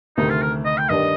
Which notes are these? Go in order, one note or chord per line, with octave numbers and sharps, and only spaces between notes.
D2 C3 D#3 A3 D#4
F4
A#4
D#5
G5
G2 D#3 G3 D4 D#5